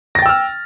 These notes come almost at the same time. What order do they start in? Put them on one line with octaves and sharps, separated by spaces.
A#6 A6 G5 E6 F6